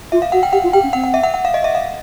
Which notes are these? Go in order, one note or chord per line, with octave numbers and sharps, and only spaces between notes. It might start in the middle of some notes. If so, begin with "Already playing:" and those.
F4 E5
F5
F#4 F#5
G5
G4 F#5
F4
G4 G5
C#4
C4 F#5
F#5
E5
F#5
F#5
F5
D#5
E5
F5